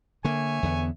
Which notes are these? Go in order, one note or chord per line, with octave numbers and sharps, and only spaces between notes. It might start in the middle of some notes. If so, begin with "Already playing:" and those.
D3 A#3 C#5 E5 G#5
E2 D3 B3